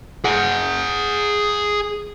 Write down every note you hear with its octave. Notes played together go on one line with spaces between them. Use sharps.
G#4 F#5